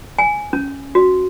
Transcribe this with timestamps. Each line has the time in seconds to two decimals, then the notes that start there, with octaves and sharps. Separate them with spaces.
0.19 G#5
0.53 C#4
0.95 F#4